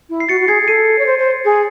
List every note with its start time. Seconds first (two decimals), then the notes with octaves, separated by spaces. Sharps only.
0.10 E4
0.20 C7
0.29 F#4 A6 C#7
0.40 F#4
0.48 G#4 G#6 C7
0.62 G#4
0.67 A4 C7 D#7
0.99 C#5
1.06 C5
1.19 C5
1.45 G#4